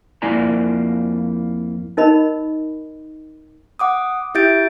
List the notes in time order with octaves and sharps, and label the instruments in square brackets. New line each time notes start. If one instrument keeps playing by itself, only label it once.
[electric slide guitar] F2 A#3 E4 D5 G#5 A#5
[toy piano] D#4 A#4 D#5 B5
[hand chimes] F#5 D6 D#6
E4 G4 E5 G6 A6 D7